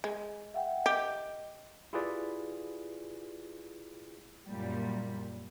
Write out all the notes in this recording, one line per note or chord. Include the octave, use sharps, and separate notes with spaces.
G#3
E5 F#5 G5
G4 D#5
E4 F4 G4 G#4 B4 D5
F#2 A#2 G3